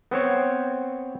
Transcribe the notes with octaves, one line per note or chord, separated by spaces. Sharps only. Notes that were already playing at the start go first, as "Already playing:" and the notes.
B3 C4 C5 C#5